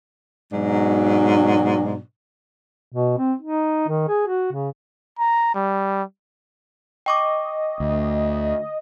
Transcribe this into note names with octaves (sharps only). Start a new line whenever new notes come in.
G#2 B2 F#3 D4
B2
C4
D#4
D#3
G#4
F#4
C#3
A#5
G3
D#5 G5 C#6 D6
D2